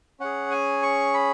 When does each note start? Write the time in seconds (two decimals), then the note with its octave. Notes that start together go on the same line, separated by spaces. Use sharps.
0.20 C#4 G#4 F#5
0.51 G#5
0.82 C#6
1.14 B5